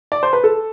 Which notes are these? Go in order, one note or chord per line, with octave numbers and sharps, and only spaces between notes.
D5
C5
B4
A4